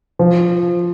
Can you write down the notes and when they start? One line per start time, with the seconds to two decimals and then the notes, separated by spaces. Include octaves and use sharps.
0.19 F3